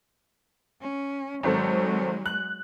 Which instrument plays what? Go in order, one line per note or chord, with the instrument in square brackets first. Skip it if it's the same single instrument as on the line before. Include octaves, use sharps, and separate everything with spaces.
[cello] C#4
[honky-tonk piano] G#1 C4 A4 [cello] F#3 G#3
[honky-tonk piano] F#6